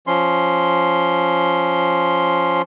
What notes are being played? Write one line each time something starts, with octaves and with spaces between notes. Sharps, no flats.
F3 C#4 C6